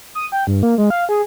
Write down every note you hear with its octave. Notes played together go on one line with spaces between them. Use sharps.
D#6
G5
G2
A#3
G#3
F5
G#4